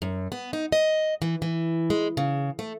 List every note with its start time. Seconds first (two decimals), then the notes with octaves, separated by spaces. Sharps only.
0.02 F#2
0.32 B3
0.53 D#4
0.72 D#5
1.22 E3
1.42 E3
1.90 G#3
2.17 C#3
2.59 A3